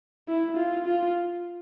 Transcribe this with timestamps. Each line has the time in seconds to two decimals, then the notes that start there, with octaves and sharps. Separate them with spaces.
0.28 E4
0.57 F4
0.86 F4